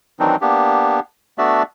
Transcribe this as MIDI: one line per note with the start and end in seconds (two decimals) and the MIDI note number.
0.20 0.36 51
0.20 0.36 52
0.20 0.36 54
0.20 0.36 60
0.20 0.36 62
0.20 0.36 63
0.41 1.00 58
0.41 1.00 59
0.41 1.00 62
0.41 1.00 67
1.38 1.63 57
1.38 1.63 59
1.38 1.63 62
1.38 1.63 66
1.38 1.63 74
1.38 1.63 76